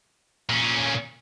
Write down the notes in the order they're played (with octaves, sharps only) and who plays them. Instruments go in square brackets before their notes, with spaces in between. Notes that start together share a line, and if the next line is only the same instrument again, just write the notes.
[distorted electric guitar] A#2 C#4